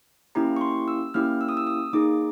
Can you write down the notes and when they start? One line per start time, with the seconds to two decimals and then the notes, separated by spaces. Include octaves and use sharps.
0.35 A#3 C#4 E4 G4 A#5
0.56 C#6
0.61 C6
0.88 E6
1.14 A#3 C#4 E4 G4 F6
1.41 E6
1.49 D#6
1.57 E6
1.67 D#6
1.93 A#3 D#4 G#4 D6